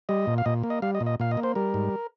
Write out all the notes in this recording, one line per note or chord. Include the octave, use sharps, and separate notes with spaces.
G3 D#5
A#2
F5
A#2 D#5
A#3
D#5
G3 F5
D#5
A#2
D#5
A#2 F5
D#5
A#3
C5
G3 A#4
G#2